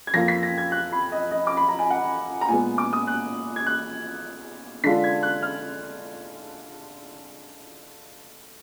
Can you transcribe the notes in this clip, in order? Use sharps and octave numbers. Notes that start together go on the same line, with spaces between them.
G#6
F2 F3 A#3 F4 A#6
B6
A#6
G#6
F#6
B5
D#5
D#5
D6
B5
A#5
G#5
F#5
A#5
A#2 G#3 B3 G#5
D6
D#6
F#6
G#6
F#6
D3 G#3 D4 F4 B6
G#6
F#6
F6